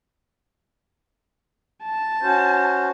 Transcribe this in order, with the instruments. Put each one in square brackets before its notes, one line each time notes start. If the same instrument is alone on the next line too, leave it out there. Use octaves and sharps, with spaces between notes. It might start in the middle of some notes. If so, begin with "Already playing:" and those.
[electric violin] A5
[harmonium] C#4 F#4 C5